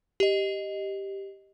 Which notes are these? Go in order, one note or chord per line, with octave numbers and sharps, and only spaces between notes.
G4 D#5